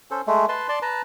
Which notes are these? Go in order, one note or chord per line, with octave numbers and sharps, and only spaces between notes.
C#4 A4 C5
G#3 A3
B4 A5 C6
D5 A5 C6
B4 A5 A#5